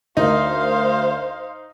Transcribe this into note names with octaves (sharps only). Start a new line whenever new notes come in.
D2 D#4 A#4 C5 F5